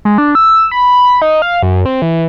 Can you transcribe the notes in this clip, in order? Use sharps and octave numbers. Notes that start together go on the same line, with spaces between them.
G#3
D4
E6
B5
D#4
F5
F#2
C4
E3